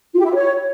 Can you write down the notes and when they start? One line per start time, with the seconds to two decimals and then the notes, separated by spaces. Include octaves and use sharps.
0.13 F4
0.19 G4
0.24 E4
0.29 F4
0.34 C#5